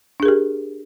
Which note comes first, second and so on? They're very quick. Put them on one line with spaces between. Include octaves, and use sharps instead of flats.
D4 G#4 A#4 G4